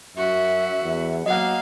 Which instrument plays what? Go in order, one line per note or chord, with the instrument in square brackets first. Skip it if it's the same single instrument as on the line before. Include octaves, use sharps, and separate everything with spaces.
[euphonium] F#2 [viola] F#4 [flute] E5
[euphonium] E2
[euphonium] F#3 [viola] A#3 F5 [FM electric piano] D#5 F#5